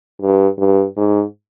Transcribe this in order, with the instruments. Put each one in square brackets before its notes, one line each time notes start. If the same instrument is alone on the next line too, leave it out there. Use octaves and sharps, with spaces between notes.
[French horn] G2
G2
G#2